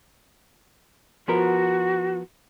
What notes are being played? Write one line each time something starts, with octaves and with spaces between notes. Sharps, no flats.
F3 B3 F#4 A#4